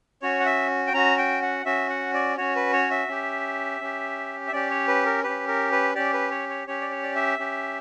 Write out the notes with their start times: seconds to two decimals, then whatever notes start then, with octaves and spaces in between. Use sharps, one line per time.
0.22 C#4 F#4 C#5
0.40 F#5
0.46 E5
0.87 G5
0.94 C#4 F#4 A#5
1.18 G5
1.42 F#5
1.66 C#4 F#4 E5
1.90 F#5
2.14 D5
2.37 C#4 F#4 C#5
2.56 B4
2.73 C#5
2.91 E5
3.08 C#4 G4
3.81 C#4 G4
4.47 E5
4.52 C#4 G4 D5
4.70 C#5
4.88 B4
5.06 A#4
5.23 C#4 G4 B4
5.48 A#4
5.72 B4
5.95 C#4 G4 D5
6.13 B4
6.31 C#5
6.49 C#5
6.67 C#4 G4 C#5
6.82 D5
6.91 C#5
7.03 D5
7.15 E5
7.39 C#4 G4